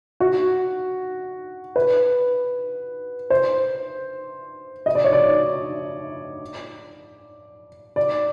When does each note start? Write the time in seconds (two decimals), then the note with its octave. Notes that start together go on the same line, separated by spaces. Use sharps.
0.20 F#4
1.76 B4
3.30 C5
4.86 D#5
4.95 D5
5.04 C#5
5.13 D5
7.96 D5